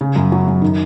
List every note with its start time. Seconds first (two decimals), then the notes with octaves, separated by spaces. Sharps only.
0.01 C#3
0.16 F#2
0.32 F#3
0.47 F#2
0.62 D#3